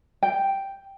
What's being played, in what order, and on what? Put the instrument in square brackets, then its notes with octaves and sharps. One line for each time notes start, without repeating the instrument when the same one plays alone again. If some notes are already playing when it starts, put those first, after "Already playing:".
[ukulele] G5